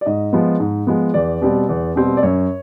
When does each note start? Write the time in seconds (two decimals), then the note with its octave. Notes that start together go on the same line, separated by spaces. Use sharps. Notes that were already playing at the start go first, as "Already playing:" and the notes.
0.01 D5
0.06 G#2 D#5
0.33 F3 G#3 B3
0.60 G#2
0.87 F3 G#3 B3
1.14 E2 D5
1.42 B2 G3 C4
1.69 E2
1.96 B2 G3 C4
2.17 D5
2.23 F#2 C#5